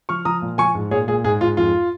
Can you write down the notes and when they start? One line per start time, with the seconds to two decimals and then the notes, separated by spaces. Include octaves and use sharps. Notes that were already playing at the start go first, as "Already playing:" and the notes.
0.09 F3 C#6 F6
0.25 F3 A#5 D#6
0.42 A#2
0.58 F3 G#5 C#6
0.75 G#2
0.91 A#2 G#4 C#5
1.08 A#2 G#4
1.24 G#2 G#4
1.41 G#2 F4
1.57 F2 F4